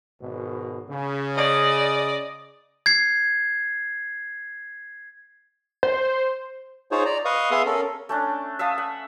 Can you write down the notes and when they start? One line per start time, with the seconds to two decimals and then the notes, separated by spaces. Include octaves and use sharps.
0.21 G#1 B2
0.89 C#3
1.35 D5 D#5
2.86 G#6 C7
5.83 C5
6.91 D#4 F4 G#4 C5 C#5
7.06 D5 A#5
7.25 B4 D#5 F5 C#6 D#6
7.51 B3 G#4 E5 F5 C6 D#6
7.66 C#4 A4 A#4
8.09 A3 C#4 D4
8.59 E5 F5 A5 D#6
8.78 F#5